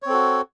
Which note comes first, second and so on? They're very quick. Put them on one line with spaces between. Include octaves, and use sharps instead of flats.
C#5 C4 A4 F#4